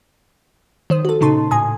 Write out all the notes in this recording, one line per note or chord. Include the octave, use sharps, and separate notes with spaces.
D#3 C5 D#6
F#4 A4
A#2 C#3 D#4 A5 C6
A2 G#5 D#6